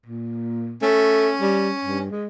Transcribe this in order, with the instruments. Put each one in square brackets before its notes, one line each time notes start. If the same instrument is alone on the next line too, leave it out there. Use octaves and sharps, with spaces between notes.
[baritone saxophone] A#2
[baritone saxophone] A3 [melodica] C#4
[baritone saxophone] G3
G2
G#3